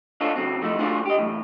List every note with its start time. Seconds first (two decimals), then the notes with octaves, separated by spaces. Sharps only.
0.21 D4 D#4 F4 A4 C5 C#5
0.36 C#3 F#3 C4
0.62 F3 A3 D#4 E4
0.78 A3 D4 F4 F#4 G#4 C5
1.06 G4 D#5
1.17 B1 E2 A2